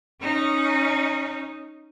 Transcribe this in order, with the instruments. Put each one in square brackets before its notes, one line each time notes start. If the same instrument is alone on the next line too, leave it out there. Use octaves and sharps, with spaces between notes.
[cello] C#4 D#4